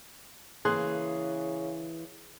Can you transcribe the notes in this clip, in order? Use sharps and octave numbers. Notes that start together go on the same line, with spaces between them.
C#3 E3 A#3 G#4 C6 F#6